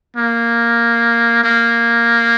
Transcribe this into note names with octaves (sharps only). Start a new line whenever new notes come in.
A#3
A#3